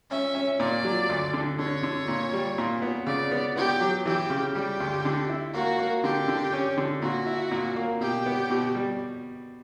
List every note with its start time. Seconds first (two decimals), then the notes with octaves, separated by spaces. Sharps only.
0.11 C#4 E5
0.35 C#4
0.60 A#2 D5
0.85 F#3
1.09 D2
1.34 D3
1.59 D3 C#5
1.83 D3
2.08 A#2
2.33 G3
2.58 A#2
2.82 B3
3.07 C#3 D5
3.32 B3
3.56 B3 G4
3.81 F#3
4.06 E3 G4
4.30 C#3
4.55 G3 G4
4.80 D2
5.05 D3
5.29 E4
5.54 A#3 F#4
5.79 A#3
6.04 D3 G4
6.28 D3
6.53 C#4
6.77 D3
7.02 A#2 F#4
7.27 E4
7.51 A#2
7.76 A#3
8.01 B2 G4
8.26 B3
8.50 B2
8.75 G3